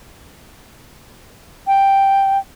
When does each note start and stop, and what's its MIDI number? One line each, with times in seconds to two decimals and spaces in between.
1.67 2.38 79